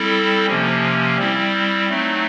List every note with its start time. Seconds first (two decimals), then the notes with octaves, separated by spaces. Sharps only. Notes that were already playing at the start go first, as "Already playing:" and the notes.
Already playing: G3 C4 E4 A4
0.46 C3 F3 A#3 C#4
1.18 G3 C4 E4
1.89 F#3 A3 C4 D#4